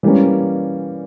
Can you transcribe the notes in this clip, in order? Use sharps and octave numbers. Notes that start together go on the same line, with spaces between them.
E3 G3 A#3 C#4